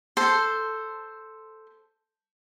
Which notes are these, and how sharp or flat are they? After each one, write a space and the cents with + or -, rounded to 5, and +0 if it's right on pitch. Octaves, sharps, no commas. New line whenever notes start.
A4 +0 C5 +0 C6 +0